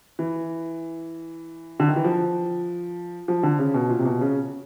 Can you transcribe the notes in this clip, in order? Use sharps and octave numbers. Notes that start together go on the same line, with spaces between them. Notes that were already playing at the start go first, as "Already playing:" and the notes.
E3
D3
D#3
E3
F3
F3
D3
C#3
B2
A#2
C3
B2
C#3